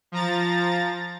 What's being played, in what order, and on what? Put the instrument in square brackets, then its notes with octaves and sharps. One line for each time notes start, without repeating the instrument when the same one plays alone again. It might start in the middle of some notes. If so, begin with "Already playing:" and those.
[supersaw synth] F3 A#5 A6